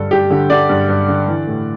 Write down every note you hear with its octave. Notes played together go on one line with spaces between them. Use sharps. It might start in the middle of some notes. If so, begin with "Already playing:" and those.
Already playing: G2 D3 A4
G2 G4
D3
D3 D5
G2
G2
D3
E3
A2